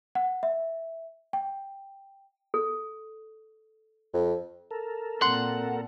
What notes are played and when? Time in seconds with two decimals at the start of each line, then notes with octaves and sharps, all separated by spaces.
0.15 F#5
0.43 E5
1.33 G5
2.54 A4
4.14 F2
4.71 A4 A#4
5.22 A#2 C4 F#5 C6